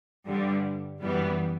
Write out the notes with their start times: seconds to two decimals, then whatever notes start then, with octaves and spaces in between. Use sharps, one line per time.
0.26 G2 D3 G3
1.01 F#2 E3 G3 B3